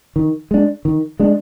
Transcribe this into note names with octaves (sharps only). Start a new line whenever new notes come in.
D#3
G#3 D4
D#3
G#3 D4